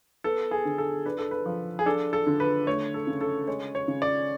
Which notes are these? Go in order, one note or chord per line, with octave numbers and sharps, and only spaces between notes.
B3 A4
G#4
D3
A4
D4 B4
A4
B4
F3
G#4
D4 A4
A4
D3
B4
A3 C#5
A4
C#3
A4
G#3 C#5
C#5
C#3
D5